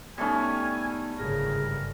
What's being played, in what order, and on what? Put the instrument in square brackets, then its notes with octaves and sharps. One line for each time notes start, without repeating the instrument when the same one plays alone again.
[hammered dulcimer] G3 A3 C#4 [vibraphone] B3 D#4 [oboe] G#5
[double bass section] G1 G#2 C#3 [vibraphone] G#4 [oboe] A#4